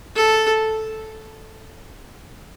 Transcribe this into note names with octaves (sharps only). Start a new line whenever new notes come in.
A4